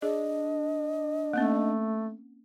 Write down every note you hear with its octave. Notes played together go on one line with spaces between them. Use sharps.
D4 G#4 D#5
A3 A#3 C4 C#4